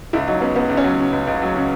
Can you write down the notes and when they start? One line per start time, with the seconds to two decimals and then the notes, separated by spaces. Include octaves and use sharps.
0.13 C#2 E4
0.27 F#3 D#4
0.41 C#3 B3
0.56 C#2 B3
0.69 C#2
0.77 C#4
0.84 F#3
0.99 C#3
1.13 C#2
1.27 C#2
1.42 F#3
1.56 C#3